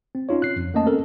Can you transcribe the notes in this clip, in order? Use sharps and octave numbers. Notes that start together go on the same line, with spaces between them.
C4
C#4 D#4 F4 C#5
F#6 C7
F2
A3 A#3 C#4 D#5 A5
C4 C#4 A4 A#4